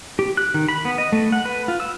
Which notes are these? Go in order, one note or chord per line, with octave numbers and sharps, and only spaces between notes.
G4
F#6
D#3
B5
B3
D#5
A3
F#5
B4
F4
E6